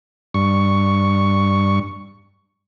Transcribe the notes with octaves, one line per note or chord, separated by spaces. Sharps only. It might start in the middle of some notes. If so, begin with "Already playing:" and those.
G2 C#6